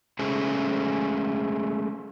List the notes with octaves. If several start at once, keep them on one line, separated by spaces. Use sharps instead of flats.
G#3 A3 C#4 G#4 A4 C5